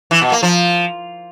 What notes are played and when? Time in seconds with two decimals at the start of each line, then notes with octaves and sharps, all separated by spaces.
0.11 E3
0.21 B2
0.32 A#3
0.43 F3